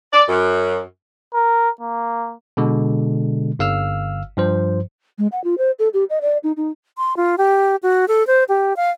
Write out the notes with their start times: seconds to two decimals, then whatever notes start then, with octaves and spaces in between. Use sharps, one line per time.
0.13 D5
0.28 F#2
1.34 A#4
1.81 A#3
2.57 B2 D3 G#3
3.59 G1 F5 E6 F6
4.37 G2 F3 C5
5.18 G#3
5.32 F#5
5.44 F4
5.58 C5
5.79 A4
5.93 G4
6.10 D#5
6.21 D5
6.43 D#4
6.57 D#4
6.98 C6
7.17 F4
7.38 G4
7.83 F#4
8.08 A4
8.27 C5
8.49 G4
8.76 F5